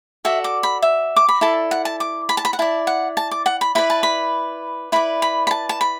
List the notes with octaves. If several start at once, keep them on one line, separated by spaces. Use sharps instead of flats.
F#4 A4 D5 E5
D6
B5
E5
D6
B5
E4 A4 D5 A5
F#5
A5
D6
B5
A5
B5
F#5
E4 D5 A5
F#5
A5
D6
F#5
B5
E4 B4 D5 B5
A5
B5
E4 B4 D5 B5
B5
B5
A5
A5
B5